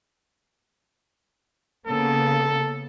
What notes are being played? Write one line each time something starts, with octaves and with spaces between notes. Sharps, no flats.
C#3 A#3 B3 A4